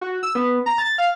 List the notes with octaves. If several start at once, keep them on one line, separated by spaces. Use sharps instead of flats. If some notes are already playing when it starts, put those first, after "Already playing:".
F#4
E6
B3
A#5
A6
F5